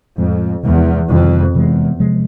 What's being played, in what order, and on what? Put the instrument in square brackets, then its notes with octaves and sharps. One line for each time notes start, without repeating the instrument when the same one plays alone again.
[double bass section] F2 [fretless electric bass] A2 F3 G#3
[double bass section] E2 [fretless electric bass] C3 F3 G#3
[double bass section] F2 [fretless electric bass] C3 D#3 G3
[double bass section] E2 [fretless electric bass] C3 E3 G#3
[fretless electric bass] C3 F3 G#3